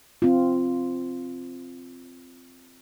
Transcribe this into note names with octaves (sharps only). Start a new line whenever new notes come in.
C4 F4